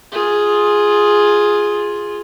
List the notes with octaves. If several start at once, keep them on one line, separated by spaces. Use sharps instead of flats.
F4 G#4